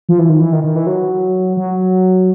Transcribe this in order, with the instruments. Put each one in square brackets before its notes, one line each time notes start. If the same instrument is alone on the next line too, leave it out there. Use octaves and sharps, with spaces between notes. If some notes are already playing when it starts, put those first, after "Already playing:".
[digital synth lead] F3
E3
D#3
E3
D#3
D#3
E3
F#3
F#3